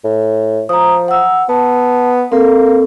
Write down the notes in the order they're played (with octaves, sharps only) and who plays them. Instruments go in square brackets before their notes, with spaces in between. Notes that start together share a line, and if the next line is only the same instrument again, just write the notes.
[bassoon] A2
[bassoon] F3 [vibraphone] A#5 D#6
[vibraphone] F#5 E6
[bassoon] B3 [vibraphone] A5
[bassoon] A#3 [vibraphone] C4 A4